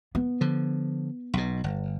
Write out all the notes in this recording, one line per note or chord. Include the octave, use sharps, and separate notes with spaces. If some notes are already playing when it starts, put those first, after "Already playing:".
B3
D3 F3
B1 B2
G1